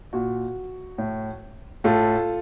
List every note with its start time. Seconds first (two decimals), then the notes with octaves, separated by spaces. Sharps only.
0.13 A#2 F#4
0.98 A2
1.84 A2 F4 A4